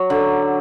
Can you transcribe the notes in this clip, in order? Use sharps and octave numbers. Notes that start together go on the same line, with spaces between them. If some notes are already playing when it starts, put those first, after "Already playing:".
Already playing: F#3
D3